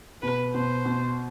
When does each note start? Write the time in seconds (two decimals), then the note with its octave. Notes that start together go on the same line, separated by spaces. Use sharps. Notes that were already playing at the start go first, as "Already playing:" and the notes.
0.22 B2 B4
0.54 B2 C5
0.85 B2